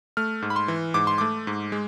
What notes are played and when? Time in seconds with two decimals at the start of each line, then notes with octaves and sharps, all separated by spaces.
0.17 A3 F6
0.42 G#2
0.50 B5
0.56 C6
0.68 E3
0.94 G#2 D6
1.07 C6
1.18 A3 D6
1.47 G#2
1.72 G#3